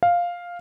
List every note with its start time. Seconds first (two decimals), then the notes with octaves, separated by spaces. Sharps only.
0.03 F5